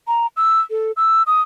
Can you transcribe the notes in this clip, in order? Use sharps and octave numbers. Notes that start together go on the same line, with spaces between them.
A#5
E6
A4
E6
D#6